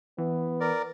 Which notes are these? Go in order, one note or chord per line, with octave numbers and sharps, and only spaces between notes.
E3 B3
A#4 D5